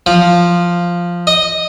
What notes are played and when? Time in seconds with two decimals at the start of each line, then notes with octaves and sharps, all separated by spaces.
0.06 F3
1.27 D#5